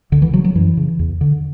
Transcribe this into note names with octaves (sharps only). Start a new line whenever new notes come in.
C#2 D3
E3
C#3 F#3
F#3
F#2 E3
C#3
E2
D3